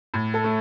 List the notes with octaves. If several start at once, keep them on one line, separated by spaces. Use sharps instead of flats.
A2
A4
A3